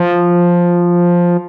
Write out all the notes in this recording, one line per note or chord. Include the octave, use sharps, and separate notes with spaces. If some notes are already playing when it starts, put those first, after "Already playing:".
Already playing: F3